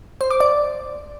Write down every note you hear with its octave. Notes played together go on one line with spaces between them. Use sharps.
C5
D6
D5